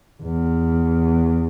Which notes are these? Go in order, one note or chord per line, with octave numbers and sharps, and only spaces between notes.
E2